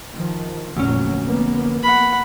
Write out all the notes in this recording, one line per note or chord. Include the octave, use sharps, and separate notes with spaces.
D#3 F3
F1 D2 A#2 F#3 C#4
F1 A#3 B3
F#5 B5